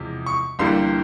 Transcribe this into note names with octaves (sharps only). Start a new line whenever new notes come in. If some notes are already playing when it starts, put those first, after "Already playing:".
Already playing: E2 C3 F3 G#3
C#6
G1 G2 E3 G3 A#3 C6